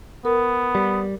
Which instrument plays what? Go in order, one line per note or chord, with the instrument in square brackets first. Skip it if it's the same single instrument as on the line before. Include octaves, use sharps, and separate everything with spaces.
[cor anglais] B3 [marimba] A#4
[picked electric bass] G3